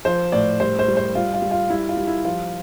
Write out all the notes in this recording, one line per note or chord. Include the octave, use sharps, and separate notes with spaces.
F3 C5
A2 D5
G3 C5
C5
G3
C5
G3 F4
F4
G3
F4
G3 E4
F4
G3
E4
F3 F4